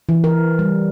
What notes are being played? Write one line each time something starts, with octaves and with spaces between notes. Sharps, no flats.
E3
A#4
G3